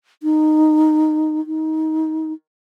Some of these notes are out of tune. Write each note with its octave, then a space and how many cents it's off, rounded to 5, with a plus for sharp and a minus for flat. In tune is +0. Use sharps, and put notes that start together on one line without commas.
D#4 -10
D#4 +20